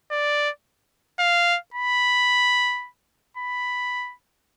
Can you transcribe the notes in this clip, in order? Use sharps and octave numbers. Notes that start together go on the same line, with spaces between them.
D5
F5
B5
B5